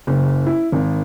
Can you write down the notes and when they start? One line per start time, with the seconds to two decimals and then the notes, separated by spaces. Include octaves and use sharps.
0.07 F#1
0.46 E4
0.72 G#1